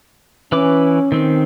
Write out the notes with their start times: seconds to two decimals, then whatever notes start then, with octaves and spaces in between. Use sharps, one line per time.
0.52 E3 C#4 B4 D6
1.12 D#3 C4